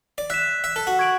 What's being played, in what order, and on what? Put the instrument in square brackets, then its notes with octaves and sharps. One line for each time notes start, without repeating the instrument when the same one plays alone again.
[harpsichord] D5
[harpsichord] E5 [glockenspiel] F#6 B6 E7
[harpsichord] E5
A4
F#4
[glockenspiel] C#6 G#6 D7 F#7